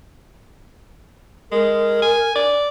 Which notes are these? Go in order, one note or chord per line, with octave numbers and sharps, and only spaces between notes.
G#3 A#4
G#5
D5